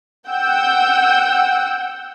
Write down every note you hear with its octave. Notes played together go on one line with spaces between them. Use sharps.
F#5 G5 E6 G6